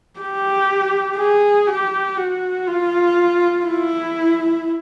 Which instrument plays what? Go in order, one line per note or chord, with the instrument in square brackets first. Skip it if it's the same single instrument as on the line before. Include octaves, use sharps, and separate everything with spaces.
[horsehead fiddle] G4
G#4
G4
F#4
F4
E4